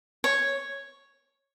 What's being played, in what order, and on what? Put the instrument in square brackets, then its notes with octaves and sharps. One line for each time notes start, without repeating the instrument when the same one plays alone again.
[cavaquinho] C#5